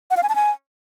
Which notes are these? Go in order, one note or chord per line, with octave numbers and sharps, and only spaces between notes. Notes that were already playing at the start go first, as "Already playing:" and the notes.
F#5
F5
G#5
A5
G#5